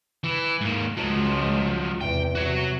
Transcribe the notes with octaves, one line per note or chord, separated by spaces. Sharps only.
E3 E4
G#2 A#3
C#2 F3 F#3 G#3
E2 C3 G5
C3 F#4 C#5